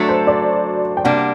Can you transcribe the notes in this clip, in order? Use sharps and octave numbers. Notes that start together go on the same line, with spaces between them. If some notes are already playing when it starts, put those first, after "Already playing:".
Already playing: F#3 A3 D4 F#4 A4
C5
D5
G5
C3 G3 A#3 D4 F#5